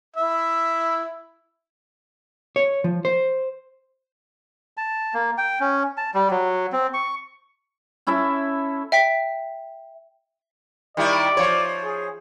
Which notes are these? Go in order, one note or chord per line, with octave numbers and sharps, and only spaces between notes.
E4 E5
C#5
F3
C5
A5
A#3
G5
C#4
A5
G3
F#3
C4
C#6
C#4 E4 A4 E5
E5 G5 B6
D#3 G3 E4 D5
F3 C#5
G#4